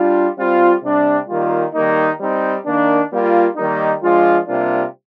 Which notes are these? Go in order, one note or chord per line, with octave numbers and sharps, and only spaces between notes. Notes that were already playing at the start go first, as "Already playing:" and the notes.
Already playing: G3 D4 F4
G3 C4 F4
C3 G3 D4
D#3 G3 A#3 F4
D#3 G3 A#3 D#4
G3 C4 D#4
D#3 A#3 D4
G3 A#3 F4
D#3 G3 A#3 D#4
F3 G#3 D4 F4
C3 G3 A#3 D4 F4